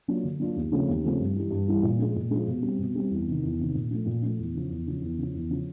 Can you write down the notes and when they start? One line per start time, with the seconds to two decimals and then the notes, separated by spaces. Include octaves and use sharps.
0.08 F#3 A#3 D4 F4
0.23 D3
0.39 F#3 A#3 D4 F4
0.56 D#2
0.71 C#3 F3 A3 C4
0.88 D#2
1.04 C#3 F3 A3 C4
1.19 G2
1.36 E3 G3
1.51 G2
1.68 E3 G3
1.82 A#2
1.99 F3 G#3
2.16 A#2
2.31 F3 G#3
2.47 B2
2.62 G3 C4
2.79 B2
2.95 G3 C4
3.10 E2
3.26 C3 D#3
3.43 E2
3.59 C3 D#3
3.75 A#2
3.91 F3 A3
4.06 A#2
4.22 F3 A3
4.38 E2
4.54 C#3 F3
4.69 E2
4.86 C#3 F3
5.01 E2
5.18 C#3 F3
5.34 E2
5.50 C#3 F3